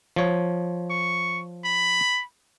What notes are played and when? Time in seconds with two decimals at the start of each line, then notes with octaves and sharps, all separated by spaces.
0.16 F3 C#5
0.90 C#6
1.65 B5